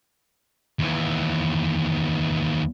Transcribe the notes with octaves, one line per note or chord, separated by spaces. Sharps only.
D#2 E3